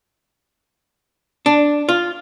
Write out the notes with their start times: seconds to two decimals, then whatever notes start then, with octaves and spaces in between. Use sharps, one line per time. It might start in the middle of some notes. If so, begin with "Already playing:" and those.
1.46 D4
1.89 F4